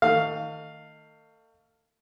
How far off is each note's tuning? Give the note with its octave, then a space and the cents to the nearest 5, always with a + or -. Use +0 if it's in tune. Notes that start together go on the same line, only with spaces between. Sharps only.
D#3 +0 A3 +35 F5 +0